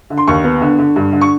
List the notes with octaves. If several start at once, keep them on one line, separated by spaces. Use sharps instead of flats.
D3
C6
D#2 C#6
B3
D3
D3
G2
D3
C#6